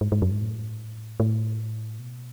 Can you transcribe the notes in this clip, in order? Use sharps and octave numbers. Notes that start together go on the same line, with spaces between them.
G#2
G#2
F#2
G#2
A2
A2
B2